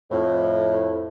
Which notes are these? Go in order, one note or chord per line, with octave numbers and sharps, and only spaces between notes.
F2 A2